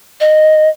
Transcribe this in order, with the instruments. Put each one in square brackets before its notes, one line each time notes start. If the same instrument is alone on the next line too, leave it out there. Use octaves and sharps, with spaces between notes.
[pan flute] D#5